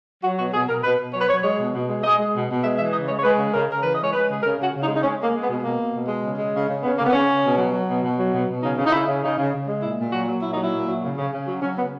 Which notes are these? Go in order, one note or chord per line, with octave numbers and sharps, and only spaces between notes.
F#3 F#4
B2 F#4
B2 G#4
B2 A#4
B2 B4
B2
F#3 C#5
B4
F#3 C#5
G#3 C#5
B2
B2
G#3
G#3 D#5
G#3
B2
B2
G#3 E5
E3 E5
C#3 D#5
G#3 C#5
C#5
G#3 B4
C#3
C#3 A#4
C#3 A#4
E3 B4
G#3 D#5
C#5
G#3 B4
C#3 G#4
C#3 A#4
C#3 F#4
C#3
D#4
G#3
D#4
G#3 C#4
G#3 A#3
G#3
B3
B2
B2 A#3
B2
B2
G#3
C#3
G#3
C#3
C#3
C#3 B3
C#3 A#3
B3
C#3 C#4
C#3
B2
F#3
F#3
B2
B2
F#3
B2
B2
C#3 D#4
C#3
D#4
C#3 E4
C#3
C#3 D#4
C#3
C#3
G#3
A#2 E4
A#2
F#3 F#4
F#3
A#2 E4
F#3 D#4
E4
A#2
F#3
C#3
C#3
C#3
F#3
F#3 C#4
C#3 B3